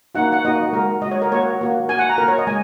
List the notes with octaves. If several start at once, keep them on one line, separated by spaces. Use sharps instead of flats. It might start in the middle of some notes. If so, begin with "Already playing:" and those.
A#3 D#4 F#4 F#5
F#5
A#3 D#4 F#4 D#5
G#3 F#4 A#4
G#3 F#4 D#5
C#5
A#4
A#3 F#4 C#5
A#3 F#4
A#3 F#4 G#5
F#5
A#5
A#3 F#4 A#4
C#5
D#5
G#3 G#5